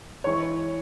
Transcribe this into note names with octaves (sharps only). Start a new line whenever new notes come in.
E3 G#3 C#5 C#6